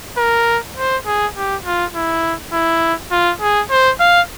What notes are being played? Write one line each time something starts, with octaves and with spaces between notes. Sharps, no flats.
A#4
C5
G#4
G4
F4
E4
E4
F4
G#4
C5
F5